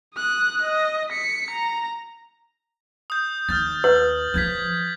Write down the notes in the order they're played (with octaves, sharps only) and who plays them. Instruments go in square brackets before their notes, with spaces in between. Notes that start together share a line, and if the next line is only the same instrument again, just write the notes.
[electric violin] D#6 F#6
D#5
B6 C#7
A#5
[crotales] D#6 G6
[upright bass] D#2 [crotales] F6 G6 A6
[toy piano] B4 [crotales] F#7
[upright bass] E3 F3 [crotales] G6 G#6 B6